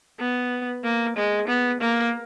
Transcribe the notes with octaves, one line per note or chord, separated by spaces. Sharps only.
B3
A#3
G#3
B3
A#3